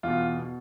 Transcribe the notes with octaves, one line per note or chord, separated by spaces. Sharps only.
E2 B2 F4
B2